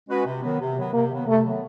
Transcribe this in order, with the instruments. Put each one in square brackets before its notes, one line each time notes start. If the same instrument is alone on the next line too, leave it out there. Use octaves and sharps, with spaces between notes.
[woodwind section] G#3 C#4 F#4 B4
C3
D#3 F#3 B3
C3
D#3 F#3 B3
[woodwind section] C3 [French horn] A#3
[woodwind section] D#3 F#3 B3
[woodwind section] C3 [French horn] A3
[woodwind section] D#3 F#3 B3